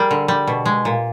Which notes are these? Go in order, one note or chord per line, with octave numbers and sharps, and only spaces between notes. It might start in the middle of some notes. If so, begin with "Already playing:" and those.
Already playing: G3 G#4 A#4
D3
G3
B2
G#3
A#2